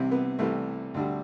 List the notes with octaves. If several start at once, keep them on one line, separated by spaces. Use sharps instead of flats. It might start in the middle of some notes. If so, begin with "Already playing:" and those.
Already playing: C2 C3 E3 C4 E4
B3
C2 C3 E3 G3 A3
D2 D3 G3